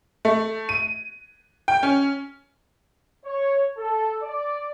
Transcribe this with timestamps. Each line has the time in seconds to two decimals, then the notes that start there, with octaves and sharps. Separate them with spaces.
0.25 A3
0.69 D#7
1.68 G5
1.83 C#4
3.25 C#5
3.78 A4
4.22 D5